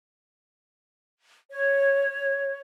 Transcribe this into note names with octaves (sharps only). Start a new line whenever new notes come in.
C#5